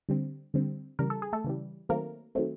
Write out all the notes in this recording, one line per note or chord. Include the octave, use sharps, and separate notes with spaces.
D3 G3 C4
D3 G3 C4
C#3 E3 G3 A#4
A4
G#4
A3 A4
C#3 E3 G3
D#3 F#3 A3 A#3 C4 A#4
D#3 F#3 A3 C4